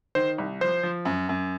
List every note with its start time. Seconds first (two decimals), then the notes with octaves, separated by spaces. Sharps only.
0.15 D#3 C5
0.38 C2
0.61 F3 C5
0.83 F3
1.05 F#2
1.29 F#2